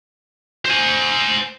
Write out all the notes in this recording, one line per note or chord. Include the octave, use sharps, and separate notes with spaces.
C5 G#5